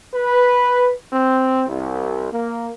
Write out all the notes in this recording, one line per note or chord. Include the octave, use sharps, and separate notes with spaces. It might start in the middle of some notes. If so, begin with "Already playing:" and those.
B4
C4
C2
A#3